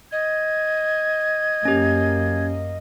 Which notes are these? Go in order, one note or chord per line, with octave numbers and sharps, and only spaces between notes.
D#5 G#6
F#2 A#3 C#4 G4